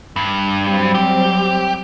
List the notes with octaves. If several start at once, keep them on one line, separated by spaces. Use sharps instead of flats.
G2
F#3 G3 C4
G4